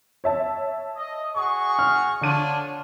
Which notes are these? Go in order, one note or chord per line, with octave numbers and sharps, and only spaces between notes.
C#5 E5 A5
D#5
F#4 G#4 C#6
F6
D3 D4 F4 C#5 D#7